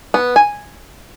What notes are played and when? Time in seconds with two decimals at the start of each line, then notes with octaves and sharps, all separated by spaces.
0.14 B3
0.36 G#5